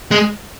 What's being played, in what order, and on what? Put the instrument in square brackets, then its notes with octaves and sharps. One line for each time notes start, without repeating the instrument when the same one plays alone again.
[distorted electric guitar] G#3